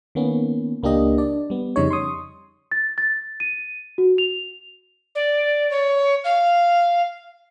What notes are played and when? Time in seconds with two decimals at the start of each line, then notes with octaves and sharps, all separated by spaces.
0.15 D#3 A#3 B3 C#4
0.83 C#2 A#3 D4 G4 D#5
1.18 D4 D5
1.50 G3 B3
1.76 F2 C#3 G3 D#4 C#5
1.91 C6 C#6 D#6
2.72 A6
2.98 A6
3.40 D#7
3.98 F#4
4.18 F7
5.15 D5
5.70 C#5
6.24 F5